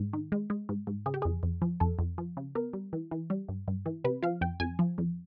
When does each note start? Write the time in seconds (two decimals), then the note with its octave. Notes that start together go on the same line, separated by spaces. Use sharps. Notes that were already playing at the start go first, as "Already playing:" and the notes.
Already playing: G#2
0.13 D#3
0.32 G#3
0.50 G#3
0.69 G#2
0.87 G#2
1.06 C#3 G#4
1.14 G4
1.22 F2 G#4
1.43 F2
1.62 F3
1.80 F2 A4
1.99 F2
2.18 F3
2.37 C#3
2.55 B3 A#4
2.73 G3
2.93 E3
3.11 E3
3.30 G3
3.49 G2
3.68 G2
3.86 E3
4.04 C3 B4
4.22 F3 F5
4.41 F2 G5
4.60 F2 G#5
4.79 F3
4.98 F2